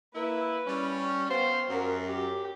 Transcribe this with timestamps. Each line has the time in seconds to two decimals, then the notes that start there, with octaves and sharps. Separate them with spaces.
0.15 A#3 E4 B4
0.66 G3 C#4
1.29 B3 C5 F5 G5
1.69 F#2 G4 A#4
2.05 G4